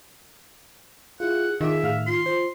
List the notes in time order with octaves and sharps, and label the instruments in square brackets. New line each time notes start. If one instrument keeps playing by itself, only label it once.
[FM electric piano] E4 F4 [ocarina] G#4 [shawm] F#5
[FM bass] D#3 [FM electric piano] F4 D6 [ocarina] G#4 [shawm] E5
[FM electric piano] A2 F5 F6
[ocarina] F4 [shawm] C6
[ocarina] F4 [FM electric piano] C5